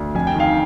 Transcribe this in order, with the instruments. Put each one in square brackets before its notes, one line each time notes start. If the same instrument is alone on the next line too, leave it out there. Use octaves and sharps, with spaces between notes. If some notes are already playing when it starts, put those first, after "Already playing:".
Already playing: [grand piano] D2
F2 G#5
G5
D#3 F5 G#5